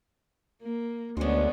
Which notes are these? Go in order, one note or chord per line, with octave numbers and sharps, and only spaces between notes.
A#3
D2 G#3 B3 C#4 D4 C5